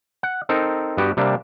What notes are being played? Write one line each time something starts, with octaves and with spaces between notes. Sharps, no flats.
F#5
C4 D#4 A4 A#4
G2 B3 F#4 G4
C3 G3 A#3 D4